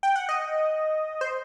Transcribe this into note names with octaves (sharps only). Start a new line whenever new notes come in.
G5
F#5
D#5
C5